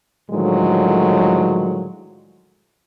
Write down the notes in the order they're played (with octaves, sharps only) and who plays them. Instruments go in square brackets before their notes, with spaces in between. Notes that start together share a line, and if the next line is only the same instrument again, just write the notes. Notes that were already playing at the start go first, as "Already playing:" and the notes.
[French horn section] A2 D3 D#3 F3 F#3 G#3